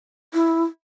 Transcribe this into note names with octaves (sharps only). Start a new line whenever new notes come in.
E4